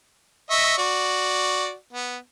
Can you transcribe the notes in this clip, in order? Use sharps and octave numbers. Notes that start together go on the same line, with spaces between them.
D#5 E5 C#6
F#4 D5
B3